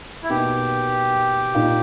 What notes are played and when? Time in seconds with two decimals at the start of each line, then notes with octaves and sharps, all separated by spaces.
0.23 E4
0.29 B2 A#3 D#4 G4
1.55 A#2 A#3 D#4